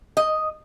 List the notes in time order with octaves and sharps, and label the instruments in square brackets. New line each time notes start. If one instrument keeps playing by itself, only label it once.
[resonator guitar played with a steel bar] D#5